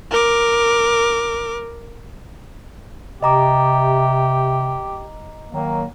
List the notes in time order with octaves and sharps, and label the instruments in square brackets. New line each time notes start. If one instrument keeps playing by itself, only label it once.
[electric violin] A#4 D6
[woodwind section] C3 [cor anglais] G4 [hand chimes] D#5 A#5 D6
[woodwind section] D#3 F#3 A#3